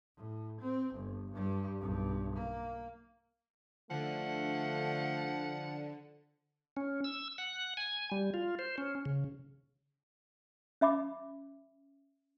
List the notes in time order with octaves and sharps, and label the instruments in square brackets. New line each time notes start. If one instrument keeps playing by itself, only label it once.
[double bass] A2
C4
G1
G2 G3
B1 G2
A#3
[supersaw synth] D3 [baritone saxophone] F3 [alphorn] A3 [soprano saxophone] F#5
[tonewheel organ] C#4
E6
F#5
G#5
G3
F4
C5
C#4
C#3
[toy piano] C#4 E5 B5 D6